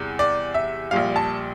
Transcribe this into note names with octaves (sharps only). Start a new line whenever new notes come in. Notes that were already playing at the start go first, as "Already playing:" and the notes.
Already playing: E2 C3 G3
D5
E5
A#1 A#2 G3 F5
A5